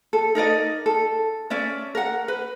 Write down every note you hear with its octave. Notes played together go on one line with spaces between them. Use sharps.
A4
D#4 A#4 D5 D#5
A4
C#4 D5 E5
A#4 F#5
B4